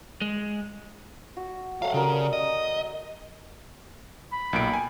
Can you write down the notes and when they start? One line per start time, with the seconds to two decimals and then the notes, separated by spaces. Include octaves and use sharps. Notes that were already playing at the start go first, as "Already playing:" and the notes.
0.21 G#3
1.37 F#4
1.82 F#3 A3 F5 F#5
1.94 C#3 G3 F#4 A#4
2.33 D#5
4.32 B5
4.53 B1 A#2 D7
4.73 G#5